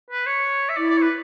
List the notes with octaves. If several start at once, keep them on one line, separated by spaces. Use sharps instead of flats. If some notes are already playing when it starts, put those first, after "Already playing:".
B4
C#5
E5
E4 D5
D5
C#5
B4